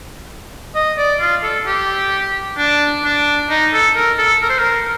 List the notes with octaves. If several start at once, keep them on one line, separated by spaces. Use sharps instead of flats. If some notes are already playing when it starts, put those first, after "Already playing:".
D#5
D5
F4
A4
G4
D4
D4
D#4
A4
A#4
A4
A#4
C5
A#4